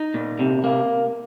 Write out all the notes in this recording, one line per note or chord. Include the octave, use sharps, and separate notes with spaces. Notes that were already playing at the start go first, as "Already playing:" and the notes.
Already playing: D#4
A#2
C3
A#3